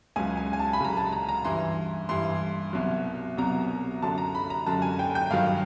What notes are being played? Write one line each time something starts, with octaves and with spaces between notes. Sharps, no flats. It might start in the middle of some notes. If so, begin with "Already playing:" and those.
C#2 C#3 F#3 G#5
G#5
G#5
A5
B5
C#2 C#3 F#3 A#5
A5
A#5
A#5
G2 E3 C6
G2 E3 C6
C2 B2 F#3
C2 B2 F#3 A#5
F#2 D3 F#3 A5
A#5
B5
A#5
F#2 D3 F#3 A5
G#5
G5
G5
G2 D#3 F#3 F5